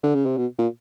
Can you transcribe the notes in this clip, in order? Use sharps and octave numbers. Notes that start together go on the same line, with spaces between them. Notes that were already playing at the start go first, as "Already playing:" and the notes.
D3
C#3
C3
B2
A#2